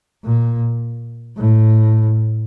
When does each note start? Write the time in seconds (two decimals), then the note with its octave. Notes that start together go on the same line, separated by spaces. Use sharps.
0.24 A#2
1.37 A2